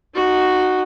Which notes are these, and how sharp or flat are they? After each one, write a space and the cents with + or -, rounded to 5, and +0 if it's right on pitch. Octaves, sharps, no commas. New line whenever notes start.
D#4 -20 F#4 +0